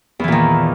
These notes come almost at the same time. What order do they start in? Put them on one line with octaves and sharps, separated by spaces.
E2 E3 A#2 D#3